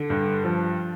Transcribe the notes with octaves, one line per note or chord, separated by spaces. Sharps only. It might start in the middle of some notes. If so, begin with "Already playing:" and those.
Already playing: D3
G2
F3